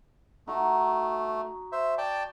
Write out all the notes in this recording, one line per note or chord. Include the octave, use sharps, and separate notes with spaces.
A3 D#4 F#4
C5 E5
D5 G5 A5